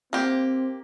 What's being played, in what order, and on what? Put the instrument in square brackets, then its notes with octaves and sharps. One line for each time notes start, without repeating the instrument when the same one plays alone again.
[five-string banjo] A#3 G4 [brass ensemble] C4